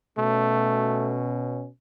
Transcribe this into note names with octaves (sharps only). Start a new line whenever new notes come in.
B2 A3 C#4